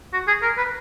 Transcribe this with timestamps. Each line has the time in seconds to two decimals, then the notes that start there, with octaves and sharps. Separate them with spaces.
0.13 F#4
0.27 G#4
0.42 A#4
0.58 B4